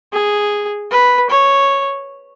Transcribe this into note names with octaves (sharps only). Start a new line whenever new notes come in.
G#4
B4
C#5